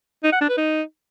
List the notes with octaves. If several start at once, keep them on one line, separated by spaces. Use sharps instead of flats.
D#4
F#5
D4
B4
D#4